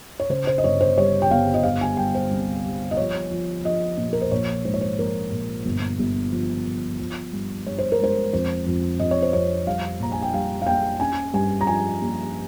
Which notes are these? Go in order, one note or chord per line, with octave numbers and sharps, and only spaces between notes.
C#5
C#3 C5
C5
D#5
G1 C#5
C5
G3 C#5
G5
G1 F5
D#5
G3 F5
G#5
G3 G5
C5
C2
G3
D#5
F3 C#5
F3
F3 D#5
A#2
A#4
C5
A#1 C#5
G#2 C5
C#5
C5
A#1 A#4
A#1
G1
G1
F3
F3
F3
G2
G2 C#5
C5
A#4
G#3 C5
F2 C5
F2
F2 D#5
C#5
C5
F2 C#5
G3 F5
A#1 A#5
G#5
G5
G3 F5
F5
A#3 G5
C#4 G#5
G2 G#5
A#5
F3 G#5
A#3